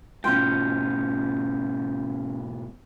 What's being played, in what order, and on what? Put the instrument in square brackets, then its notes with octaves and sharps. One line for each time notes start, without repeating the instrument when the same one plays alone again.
[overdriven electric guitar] G#2 B2 [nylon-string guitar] C#4 F4 G5 [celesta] C6 G6